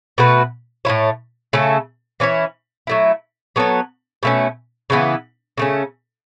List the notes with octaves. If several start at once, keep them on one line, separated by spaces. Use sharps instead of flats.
B2 A3 F#4 B4
A2 A3 E4 C#5
C#3 A3 C#4 A4
E3 C#4 E4 C#5
F#3 A3 E4
F#3 B3 A4 C#5
B2 A3 C#4
C#3 E3 B3
C#3 A3 C#4